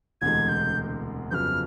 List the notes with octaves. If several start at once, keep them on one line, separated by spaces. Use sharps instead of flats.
E1 D2 C3 E3 G#3 G#6
G6
G1 F2 C#3 F#3 B3 F6 G6